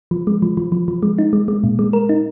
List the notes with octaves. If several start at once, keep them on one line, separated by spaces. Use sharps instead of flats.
F3
G#3
F3
F3
F3
F3
G#3
D#4
G#3
G#3
A#2
G#3
A#4
D#4